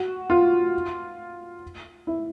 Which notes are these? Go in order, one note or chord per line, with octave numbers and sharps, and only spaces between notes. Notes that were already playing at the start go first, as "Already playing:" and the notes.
Already playing: F#4
F4
E4